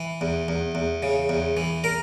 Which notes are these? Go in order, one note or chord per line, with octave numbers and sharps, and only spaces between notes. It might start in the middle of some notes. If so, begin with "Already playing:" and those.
Already playing: E3
E2
E2
E2
C#3
E2
E3
A#4